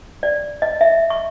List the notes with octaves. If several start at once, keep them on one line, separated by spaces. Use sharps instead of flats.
D5
D#5
E5
C#6